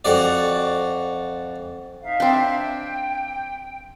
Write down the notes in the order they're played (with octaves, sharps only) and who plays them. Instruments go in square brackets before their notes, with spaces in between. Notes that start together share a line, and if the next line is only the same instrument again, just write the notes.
[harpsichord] F2 F#4 D5
[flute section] D#4 E5 F5
[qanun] C4 D4
[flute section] G5